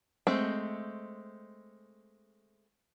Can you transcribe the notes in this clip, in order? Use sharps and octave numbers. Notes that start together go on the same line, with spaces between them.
G#3 A3 C4